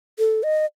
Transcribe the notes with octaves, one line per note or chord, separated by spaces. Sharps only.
A4
D#5